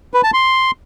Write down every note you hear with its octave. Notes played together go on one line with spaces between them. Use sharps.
B4
A5
C6